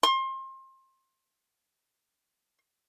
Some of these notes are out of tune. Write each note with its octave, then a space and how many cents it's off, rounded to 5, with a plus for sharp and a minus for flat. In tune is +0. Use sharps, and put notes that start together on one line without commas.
C6 +30